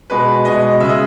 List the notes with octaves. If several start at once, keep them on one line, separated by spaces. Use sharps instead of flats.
B2 G#3 B4
B2 G#3 D#5
C#3 G#3 D#5 E5